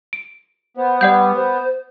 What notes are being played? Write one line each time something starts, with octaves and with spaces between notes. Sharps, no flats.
D7
B3 C5
G3 D5 F#5 G6
C5